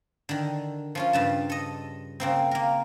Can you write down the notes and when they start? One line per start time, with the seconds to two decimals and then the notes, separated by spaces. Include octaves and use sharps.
0.29 D3 D#3
0.95 F3 C#4 F4
1.13 G2 C#3 A5
1.49 A4 D#5
2.20 C#3 A#3 C4
2.51 A#3 A#4